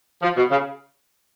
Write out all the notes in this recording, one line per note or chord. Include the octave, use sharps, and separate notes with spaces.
F3
B2
C#3